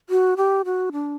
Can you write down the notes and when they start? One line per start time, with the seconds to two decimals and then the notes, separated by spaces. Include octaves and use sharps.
0.10 F#4
0.37 G4
0.65 F#4
0.92 D4